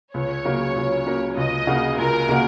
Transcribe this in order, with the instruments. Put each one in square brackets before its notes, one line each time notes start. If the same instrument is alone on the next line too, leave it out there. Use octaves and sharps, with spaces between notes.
[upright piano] C#2 [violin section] C#5
[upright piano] C#3 F#3 A#3 C#4
C#2
C#3 F#3 A#3 C#4
[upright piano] C#2 [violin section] D#5
[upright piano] C#3 A#3 F#4
[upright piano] C#2 [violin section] A#4
[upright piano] C#3 A#3 F#4